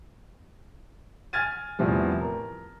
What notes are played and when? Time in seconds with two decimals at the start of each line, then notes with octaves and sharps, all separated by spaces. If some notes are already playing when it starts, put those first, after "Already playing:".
1.33 G#5 F6 G#6 A6 D#7
1.79 E2 A2 C3 F3 G3
2.20 A#4